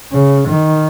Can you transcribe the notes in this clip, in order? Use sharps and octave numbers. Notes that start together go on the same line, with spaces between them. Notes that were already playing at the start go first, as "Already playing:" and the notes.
C#3
D#3